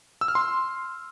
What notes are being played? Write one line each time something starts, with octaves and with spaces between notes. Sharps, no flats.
E6
F6
C6